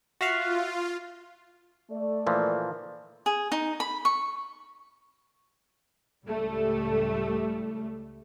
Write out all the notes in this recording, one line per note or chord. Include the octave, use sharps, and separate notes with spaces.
F4 F#4 E5 F5
A3 D5
A#2 E3 F3
G#4
D#4
B5
C#6
C#2 A2 G3 A3